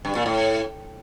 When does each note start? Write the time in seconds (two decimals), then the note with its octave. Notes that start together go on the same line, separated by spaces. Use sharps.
0.05 G2
0.15 A#2
0.26 A2